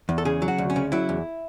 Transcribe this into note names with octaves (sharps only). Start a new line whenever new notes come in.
E2
A4
C#3 G#4
F#3
F#4
D2
C#4
C#3
F#3 E4
E2